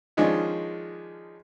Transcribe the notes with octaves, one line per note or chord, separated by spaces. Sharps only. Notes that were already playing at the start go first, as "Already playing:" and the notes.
D#3 F3 G#3 C#4 D4